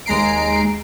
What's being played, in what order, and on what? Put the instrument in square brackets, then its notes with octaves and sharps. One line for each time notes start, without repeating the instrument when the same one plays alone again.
[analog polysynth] D#2 G#3 A#5 C7 D7